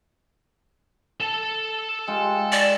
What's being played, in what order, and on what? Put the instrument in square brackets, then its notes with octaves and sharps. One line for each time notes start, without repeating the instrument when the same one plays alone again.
[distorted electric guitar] A4 A5
[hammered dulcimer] G#3 F4 G5
[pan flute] D5